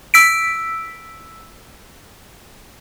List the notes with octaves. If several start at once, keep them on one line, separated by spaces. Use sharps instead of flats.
E6 B6 D7